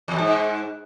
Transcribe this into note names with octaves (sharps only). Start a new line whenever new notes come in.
E2
B2
G#2